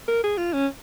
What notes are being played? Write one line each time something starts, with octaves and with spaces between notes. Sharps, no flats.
A#4
G#4
F4
C#4